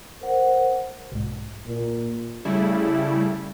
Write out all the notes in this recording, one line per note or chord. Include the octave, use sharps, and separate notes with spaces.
A#4 C5 F#5
B1 G#2
A#2
C#3 G3 A3 E4